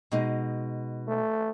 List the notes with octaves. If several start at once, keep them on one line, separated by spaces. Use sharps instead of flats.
B2 G#3 D#4
A3